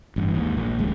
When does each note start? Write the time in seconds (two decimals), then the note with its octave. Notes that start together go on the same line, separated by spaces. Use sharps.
0.16 A1 G2
0.35 D#2 G#2
0.57 A#1
0.79 D#1 D2 G#3